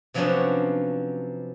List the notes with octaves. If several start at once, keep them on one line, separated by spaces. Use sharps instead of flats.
C3 F3 F#3 B3 C#4 D4